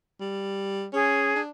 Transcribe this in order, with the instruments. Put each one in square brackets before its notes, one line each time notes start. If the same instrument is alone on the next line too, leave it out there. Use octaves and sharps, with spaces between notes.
[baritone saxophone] G3
[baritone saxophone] C#4 [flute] G#4
[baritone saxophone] D4